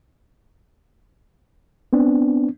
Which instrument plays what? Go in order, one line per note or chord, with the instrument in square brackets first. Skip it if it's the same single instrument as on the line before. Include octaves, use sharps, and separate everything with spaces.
[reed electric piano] B3 C4 D4